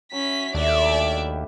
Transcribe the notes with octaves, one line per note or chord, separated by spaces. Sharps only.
F#3 C#4 E5 B5 B6
D#2 A3 D4 D5 E5
B4 G5